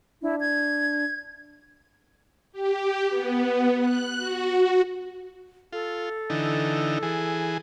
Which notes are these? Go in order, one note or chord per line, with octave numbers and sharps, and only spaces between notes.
D4 E4
G#6
G4
B3
F#6
F#4
F4 A4
D3 E3 D#4
E3 G#4